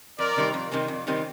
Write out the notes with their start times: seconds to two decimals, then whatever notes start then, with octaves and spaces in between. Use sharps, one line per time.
0.18 F2 A#4 D5
0.36 C3 D#3 G3 C4
0.54 F2
0.71 C3 D#3 G3 C4
0.88 F2
1.07 C3 D#3 G3 C4